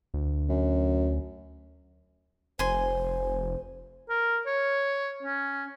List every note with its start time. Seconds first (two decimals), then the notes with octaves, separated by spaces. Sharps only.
0.14 D2
0.49 F#2
2.59 F1 C5 G#5 C6
4.09 A#4
4.47 C#5
5.23 C#4